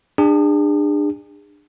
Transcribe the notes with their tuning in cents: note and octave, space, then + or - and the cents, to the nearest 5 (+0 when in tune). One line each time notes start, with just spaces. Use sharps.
D4 +25 G#4 -35